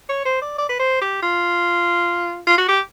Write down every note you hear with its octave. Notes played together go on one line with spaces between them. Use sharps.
C#5
C5
D5
D5
B4
C5
G4
F4
F4
F#4
G4